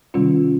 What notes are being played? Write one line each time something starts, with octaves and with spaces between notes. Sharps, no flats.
C3 D#3 G3 C#4 F4